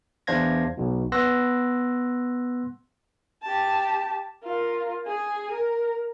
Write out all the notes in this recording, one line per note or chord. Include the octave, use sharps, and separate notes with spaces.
E2 D4 C5 F5 G#6 A#6
B1 B2
B3 C6 E6 F#6 A#6
G4 A5
F4 A#4
G#4 G#5
A#4